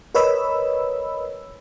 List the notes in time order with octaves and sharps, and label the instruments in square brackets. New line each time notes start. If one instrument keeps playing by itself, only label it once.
[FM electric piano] A#4 B4 C#5 D#5 B5 E6